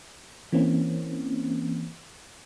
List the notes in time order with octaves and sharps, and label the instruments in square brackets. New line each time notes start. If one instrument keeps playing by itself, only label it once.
[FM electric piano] E3 A#3 C4 C#4